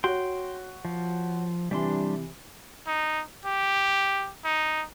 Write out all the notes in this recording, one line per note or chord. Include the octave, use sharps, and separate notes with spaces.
F#4 C#5 G5 C6
F3
C3 E3 G3 D4 C6
D#4
G4
D#4